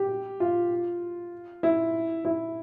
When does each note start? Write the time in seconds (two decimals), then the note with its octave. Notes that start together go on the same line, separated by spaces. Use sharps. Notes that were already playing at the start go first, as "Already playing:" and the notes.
Already playing: G4
0.40 F4
1.63 E4
2.25 E4